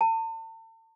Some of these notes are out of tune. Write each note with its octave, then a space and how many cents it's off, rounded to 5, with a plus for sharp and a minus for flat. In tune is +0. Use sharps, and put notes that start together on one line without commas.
A5 +40